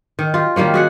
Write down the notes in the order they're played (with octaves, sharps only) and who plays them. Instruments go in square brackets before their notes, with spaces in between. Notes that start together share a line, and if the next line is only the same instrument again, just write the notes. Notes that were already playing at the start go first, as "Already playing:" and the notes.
[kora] D#3
F4 G4
D#3 G3 A#3 C#4
F#4 G#4 F#5